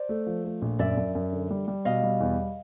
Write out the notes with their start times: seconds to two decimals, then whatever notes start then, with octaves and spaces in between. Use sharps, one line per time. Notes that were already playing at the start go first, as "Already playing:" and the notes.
Already playing: C5 D5
0.09 A3
0.27 F3
0.45 A3
0.62 A#1
0.79 F#2 D5 E5
0.97 F#2
1.15 F#2
1.32 D3
1.50 G3
1.68 G3
1.85 B2 D#5 F5
2.03 G3
2.20 E2